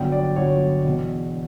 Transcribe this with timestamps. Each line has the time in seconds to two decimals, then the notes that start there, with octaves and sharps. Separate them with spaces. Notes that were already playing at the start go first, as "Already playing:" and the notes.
Already playing: G1 G2 F#3 B3 G5
0.12 D5
0.36 G1 G2 F#3 B3 C#5
0.84 E1 E2 B2